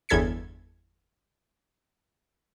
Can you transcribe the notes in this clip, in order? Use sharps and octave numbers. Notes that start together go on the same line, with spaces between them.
G1 E2 A4 G#6 B6 C#7